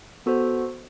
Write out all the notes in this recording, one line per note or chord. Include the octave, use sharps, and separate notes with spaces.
B3 F#4 A4 C5